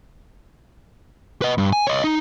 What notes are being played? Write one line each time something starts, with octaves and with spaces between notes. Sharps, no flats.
B4 D#5
G2
G#5
C#5 D#5
D#4